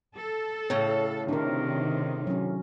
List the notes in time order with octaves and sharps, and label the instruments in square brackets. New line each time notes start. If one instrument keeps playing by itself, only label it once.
[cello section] A4
[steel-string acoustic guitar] A2 C#3
[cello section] C3 D#3 [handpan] D4 A#4
[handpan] F#3 C#4